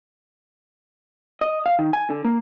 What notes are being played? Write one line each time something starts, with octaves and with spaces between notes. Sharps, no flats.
D#5
F5
D#3
G#5
D3
A#3